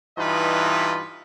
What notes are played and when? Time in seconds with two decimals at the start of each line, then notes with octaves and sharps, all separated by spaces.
0.18 G2 E3 D#4 F4 B4 D#5